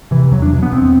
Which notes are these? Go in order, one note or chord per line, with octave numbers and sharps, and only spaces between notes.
C3 E3
E2 F#3
D4
B2
B3
E2 C4